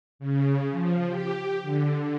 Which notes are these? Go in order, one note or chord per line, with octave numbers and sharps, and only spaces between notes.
C#3
F3
G4
D3